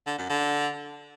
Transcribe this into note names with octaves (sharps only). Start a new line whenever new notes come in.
D3
F#2
D3